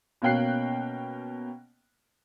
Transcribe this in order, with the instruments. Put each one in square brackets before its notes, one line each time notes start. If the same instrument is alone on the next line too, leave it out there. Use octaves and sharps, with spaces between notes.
[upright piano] B2 A#3 C#4 G5 F#6 C7